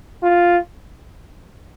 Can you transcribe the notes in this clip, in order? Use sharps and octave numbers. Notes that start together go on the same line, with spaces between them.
F4